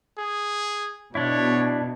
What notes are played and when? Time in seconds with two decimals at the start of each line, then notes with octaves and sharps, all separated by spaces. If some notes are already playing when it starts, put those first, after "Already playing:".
0.18 G#4
1.15 B2 D4 E4 C#5